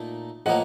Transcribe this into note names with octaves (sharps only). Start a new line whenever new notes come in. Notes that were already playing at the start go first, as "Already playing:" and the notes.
Already playing: A#2 A3 D#4
A2 F3 A#3 D#5 F#5